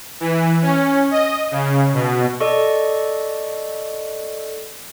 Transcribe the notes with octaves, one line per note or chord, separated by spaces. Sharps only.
E3
C#4
D#5
C#3
B2
A4 D5 D#5 C#6